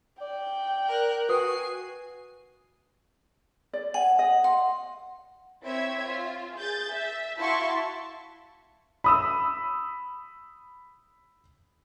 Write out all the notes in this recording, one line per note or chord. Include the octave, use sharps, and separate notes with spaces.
D5 G5
A#4 F#6
F#4 B4 G#5 D#6 C7
D5
F#5 G#5
D#5
F#5 C6
C4 E4 C#5 E5 G#6
F4
G#4 G6 A6
E5
E4 F#4 F5 A5 C6 C#6
B5 D#6 E6